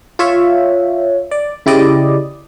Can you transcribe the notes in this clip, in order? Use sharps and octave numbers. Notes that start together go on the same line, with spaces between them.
F4 C#5 E5
D5
C#3 E4 G4 D5 D#5